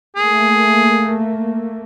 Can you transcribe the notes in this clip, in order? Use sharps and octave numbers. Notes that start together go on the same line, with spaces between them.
A3 A#3 G#4